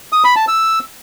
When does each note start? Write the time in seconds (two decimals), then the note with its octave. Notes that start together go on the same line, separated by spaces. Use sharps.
0.13 D#6
0.24 B5
0.36 A5
0.48 E6